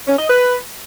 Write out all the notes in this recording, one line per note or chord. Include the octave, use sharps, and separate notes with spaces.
C#4
D#5
B4